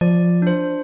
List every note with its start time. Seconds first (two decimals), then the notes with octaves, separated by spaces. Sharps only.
0.01 F3 D5
0.42 D4 C5